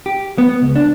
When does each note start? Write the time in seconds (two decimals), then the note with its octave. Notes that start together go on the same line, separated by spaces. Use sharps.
0.06 G4
0.38 B3
0.62 C#2
0.76 D4